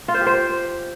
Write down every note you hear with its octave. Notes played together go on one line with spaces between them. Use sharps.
F4
C5
G4
C5